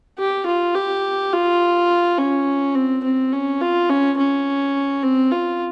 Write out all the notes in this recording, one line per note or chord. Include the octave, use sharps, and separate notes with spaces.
G4
F4
G4
F4
C#4
C4
C4
C#4
F4
C#4
C#4
C4
F4